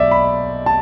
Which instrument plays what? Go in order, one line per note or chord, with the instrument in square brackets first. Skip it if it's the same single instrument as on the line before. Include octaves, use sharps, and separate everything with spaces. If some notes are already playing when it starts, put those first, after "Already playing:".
Already playing: [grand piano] B1 D5 E5
B5
A5